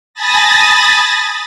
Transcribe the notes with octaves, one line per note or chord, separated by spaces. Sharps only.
G#5 A5 B5 D#6 A6 A#6